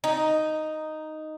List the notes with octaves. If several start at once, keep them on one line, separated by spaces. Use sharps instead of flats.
D#4